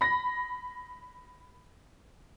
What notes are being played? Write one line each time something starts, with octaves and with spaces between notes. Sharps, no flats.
B5 A#6